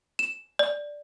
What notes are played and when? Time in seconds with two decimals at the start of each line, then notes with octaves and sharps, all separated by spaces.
0.19 E7
0.59 D5